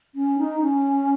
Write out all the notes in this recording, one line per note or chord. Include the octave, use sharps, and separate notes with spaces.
C#4
D#4
C#4